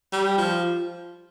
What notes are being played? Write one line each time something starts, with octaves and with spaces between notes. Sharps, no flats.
G3
F3